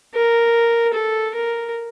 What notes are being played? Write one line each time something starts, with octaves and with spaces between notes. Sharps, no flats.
A#4
A4
A#4